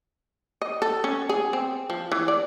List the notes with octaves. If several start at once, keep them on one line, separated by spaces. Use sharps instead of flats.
D#5
A4
C#4
G#4
C4
F3
E3
D5